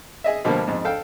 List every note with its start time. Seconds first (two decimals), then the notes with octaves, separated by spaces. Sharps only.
0.24 G#4 D#5 E5
0.45 B2 D3 F3 G3 A3 A#3
0.67 F2 G#2
0.85 A4 F5 G5